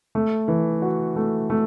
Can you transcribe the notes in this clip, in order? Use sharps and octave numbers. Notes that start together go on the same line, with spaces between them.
A3
E3
F#4
A3
A3